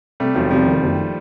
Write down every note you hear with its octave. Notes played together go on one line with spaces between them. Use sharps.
C3 G3 A3
E1 D#3 F3
C3 F3 G3
D#3
F#1